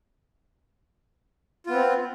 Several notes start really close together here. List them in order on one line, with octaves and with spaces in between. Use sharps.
F4 B3 C4